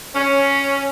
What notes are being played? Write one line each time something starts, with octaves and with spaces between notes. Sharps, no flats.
C#4